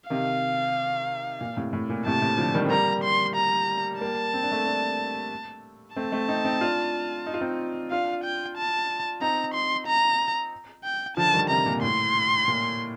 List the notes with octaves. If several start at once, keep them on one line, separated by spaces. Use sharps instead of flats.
C3 D#3 F5
A#2
A2 C3
A2
A#2
A2 C3 A5
A2 C3
D3 F3
D#3 G3
C4
G3 A#3 A#5
C6
A#5
G3 A#3 A5
C4
D4
A3 C4
A#3 D4
A3 C4 A5
A3 C4
C4 D#4
C4 D#4
D4 F4
D#4
F4
C4 D#4
D4 F4 F5
G5
A5
C4 D#4 A#5
C6
A#5
G5
D3 F3 A5
D#3 G3
C3 D#3 A#5
A#2
A2 C6
A#2